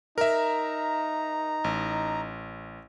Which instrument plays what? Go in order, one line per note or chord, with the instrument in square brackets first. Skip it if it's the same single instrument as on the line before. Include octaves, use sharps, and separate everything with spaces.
[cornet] D#4 [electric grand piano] A#4 E5 [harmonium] A#5
[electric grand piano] A1